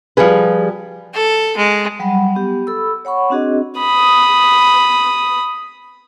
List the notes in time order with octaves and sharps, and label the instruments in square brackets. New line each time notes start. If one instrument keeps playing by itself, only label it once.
[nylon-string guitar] F3 G3 G4 G#4 B4
[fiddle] A4
G#3
[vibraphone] F#3 G3 F#5 B5
B3 G4
A4 B5 E6
C#5 F#5 B5 C#6
C4 D4 F#4 G#4 D#5
[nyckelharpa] B5 D#6